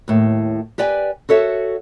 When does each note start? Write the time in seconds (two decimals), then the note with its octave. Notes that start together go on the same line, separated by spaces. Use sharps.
0.08 D#2 A2
0.78 G4 B4 D5 G5 G#5
1.29 F#4 A4 C#5 E5